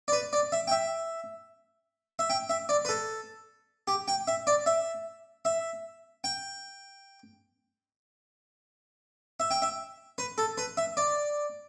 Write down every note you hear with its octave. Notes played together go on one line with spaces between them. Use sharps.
D5
B4
D5
E5
G5
E5
E5
G5
E5
D5
B4
A4
G4
G5
E5
D5
E5
E5
G5
E5
G5
E5
B4
A4
B4
E5
D5